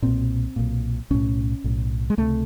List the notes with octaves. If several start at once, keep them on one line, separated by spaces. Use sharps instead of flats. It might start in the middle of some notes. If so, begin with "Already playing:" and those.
B1 A#2 C4
B1 A#2
B1 A2 C#4
B1 A2
G#3
C#2 C3 A3